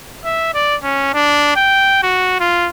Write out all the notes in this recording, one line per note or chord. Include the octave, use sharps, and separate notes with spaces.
E5
D5
C#4
D4
G5
F#4
F4